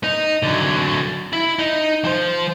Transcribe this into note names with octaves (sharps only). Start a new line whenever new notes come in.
D#4
D3 F#3
E4
D#4
F3 C5